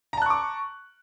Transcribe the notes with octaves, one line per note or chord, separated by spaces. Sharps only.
A5 A#5 C#6 D6 F#6